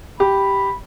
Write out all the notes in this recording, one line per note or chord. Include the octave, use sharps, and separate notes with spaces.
G4 B5